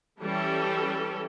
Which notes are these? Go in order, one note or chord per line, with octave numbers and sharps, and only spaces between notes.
E3 G3 C#4 A4